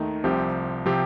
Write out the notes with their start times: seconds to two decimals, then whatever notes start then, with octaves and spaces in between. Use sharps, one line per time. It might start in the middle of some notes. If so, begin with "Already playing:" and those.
Already playing: D#2 D#3 A3 D#4
0.24 C2 C3 F3 C4 G4
0.86 C3 F3 C4 G4